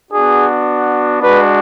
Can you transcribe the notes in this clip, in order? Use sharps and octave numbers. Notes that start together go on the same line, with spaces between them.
B3 D4 F#4 G#4
G#3 D4 F#4 B4